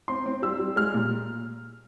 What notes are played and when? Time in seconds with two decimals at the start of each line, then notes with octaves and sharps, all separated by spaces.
0.08 C4 C6
0.26 C4
0.42 G3 E6
0.59 G3
0.76 G#3 F6
0.94 A#2